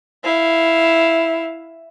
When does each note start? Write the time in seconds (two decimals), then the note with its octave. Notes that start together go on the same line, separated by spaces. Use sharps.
0.24 E4 F5